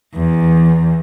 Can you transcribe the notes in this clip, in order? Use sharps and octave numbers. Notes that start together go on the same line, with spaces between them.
E2